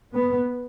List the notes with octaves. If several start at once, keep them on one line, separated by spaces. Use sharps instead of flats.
B3